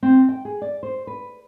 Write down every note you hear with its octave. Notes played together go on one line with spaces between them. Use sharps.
C4
G5
G#4
D5
C5
B4